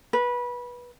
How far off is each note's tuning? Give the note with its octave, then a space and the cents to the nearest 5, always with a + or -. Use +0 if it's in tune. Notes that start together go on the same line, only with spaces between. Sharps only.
B4 -20